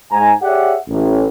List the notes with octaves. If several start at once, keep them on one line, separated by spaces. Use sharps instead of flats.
G#2 G#5 A#5
G4 G#4 C#5 D5 E5 F#5
A1